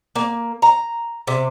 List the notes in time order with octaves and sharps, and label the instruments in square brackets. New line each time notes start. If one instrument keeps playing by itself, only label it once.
[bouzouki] A#3
A#5
C3